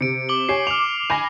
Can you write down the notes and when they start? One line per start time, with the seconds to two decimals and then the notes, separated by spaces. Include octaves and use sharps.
0.01 C3 C#7 D7
0.29 D6 F#7 G7
0.49 G4 C#5 G#5 C7
0.67 D6 F6 F7
1.10 G#5 B5 A#6